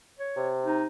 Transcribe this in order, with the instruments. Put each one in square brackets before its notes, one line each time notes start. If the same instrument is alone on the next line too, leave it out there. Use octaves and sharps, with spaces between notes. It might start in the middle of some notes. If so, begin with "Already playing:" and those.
[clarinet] C#5
[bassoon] C3
[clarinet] D#4